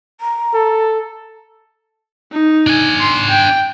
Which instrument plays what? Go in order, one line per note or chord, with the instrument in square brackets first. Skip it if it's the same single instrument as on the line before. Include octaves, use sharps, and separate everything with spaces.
[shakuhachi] A#5
[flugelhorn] A4
[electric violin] D#4
[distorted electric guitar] D4 G#5
[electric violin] C6
G5